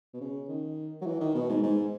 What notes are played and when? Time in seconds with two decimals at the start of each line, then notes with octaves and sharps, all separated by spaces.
0.14 B2
0.21 C#3
0.49 D#3
1.01 F#3
1.07 E3
1.21 D#3
1.35 B2
1.49 G#2
1.63 G#2